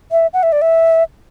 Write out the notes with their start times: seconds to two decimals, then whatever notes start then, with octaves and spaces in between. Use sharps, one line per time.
0.12 E5
0.33 F#5
0.43 E5
0.52 D5
0.62 E5